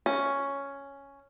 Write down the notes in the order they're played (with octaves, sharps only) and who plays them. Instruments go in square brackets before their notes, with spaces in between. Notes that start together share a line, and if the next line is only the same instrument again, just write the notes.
[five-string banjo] C#4